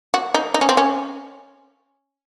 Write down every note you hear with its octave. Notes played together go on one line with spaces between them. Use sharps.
F#4
D#4
D#4
C#4
C4
C#4